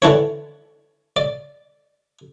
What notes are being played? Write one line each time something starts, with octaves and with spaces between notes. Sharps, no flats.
D3 E3 D4 C#5
D5